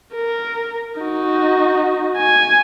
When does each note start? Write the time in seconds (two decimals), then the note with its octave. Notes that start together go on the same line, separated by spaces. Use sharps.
0.15 A#4
1.00 D#4 F#4
2.17 G#5